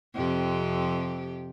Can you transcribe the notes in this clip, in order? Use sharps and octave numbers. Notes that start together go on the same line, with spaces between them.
F2 C3 G4